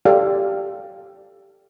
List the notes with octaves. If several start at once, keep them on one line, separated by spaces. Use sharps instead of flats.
G4 A4 D5 F5